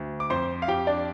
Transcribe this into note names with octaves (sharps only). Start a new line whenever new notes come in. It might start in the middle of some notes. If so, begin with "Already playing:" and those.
Already playing: D2
D6
F2 C5 C6
F5
F2 G4 G5
D4 D5